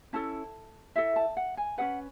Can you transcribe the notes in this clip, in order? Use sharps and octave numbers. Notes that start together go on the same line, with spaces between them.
C#4 E4 A4 A5
E4 A4 E5
A5
F#5
G#5
C#4 G#4 B4 F#5